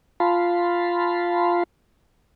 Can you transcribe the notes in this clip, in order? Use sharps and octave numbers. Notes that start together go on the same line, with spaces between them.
F4 F5 A5 B5 C6